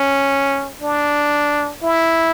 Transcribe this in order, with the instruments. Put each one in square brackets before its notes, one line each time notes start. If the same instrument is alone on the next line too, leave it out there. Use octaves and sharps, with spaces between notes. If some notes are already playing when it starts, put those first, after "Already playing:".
Already playing: [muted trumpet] C#4
D4
E4